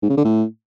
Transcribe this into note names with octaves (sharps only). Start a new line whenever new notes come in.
G#2
C#3
D3
A2